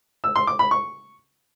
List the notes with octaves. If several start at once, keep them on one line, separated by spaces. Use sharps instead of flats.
E6
C6
D6
B5
C#6